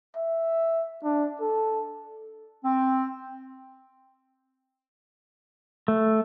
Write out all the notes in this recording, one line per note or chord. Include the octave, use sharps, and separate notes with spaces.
E5
D4
A4
C4
A3